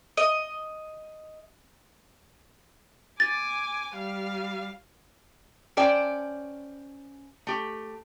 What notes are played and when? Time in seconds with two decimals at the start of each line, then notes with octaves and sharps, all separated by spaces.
0.17 D#5
3.20 G#5 D6 A6
3.95 G3 F5
5.77 C#4 C5 D5 G5 A5
7.47 A3 G4